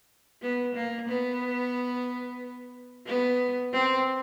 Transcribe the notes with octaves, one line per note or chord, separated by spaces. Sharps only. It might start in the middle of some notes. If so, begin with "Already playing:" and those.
B3
A#3
B3
B3
C4